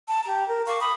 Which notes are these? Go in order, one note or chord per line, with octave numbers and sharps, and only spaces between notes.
A5
G4 A#5
A#4
F5 C#6 D6
B5 D#6